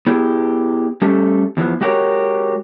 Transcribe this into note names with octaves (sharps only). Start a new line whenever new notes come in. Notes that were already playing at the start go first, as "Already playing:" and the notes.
B3 E4 G4 G#4
G3 A3 C#4 G4 A4
E2 E3 F3 B3
G#3 F#4 G4 A4 A#4 C#5